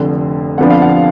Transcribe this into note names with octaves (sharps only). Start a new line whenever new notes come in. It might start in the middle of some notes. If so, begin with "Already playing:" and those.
Already playing: F1 F2 D3
F2 D3 F3 B3 D4 F#5
F5
F#5